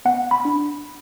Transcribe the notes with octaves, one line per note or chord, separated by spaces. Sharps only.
B3 F#5
B5
D4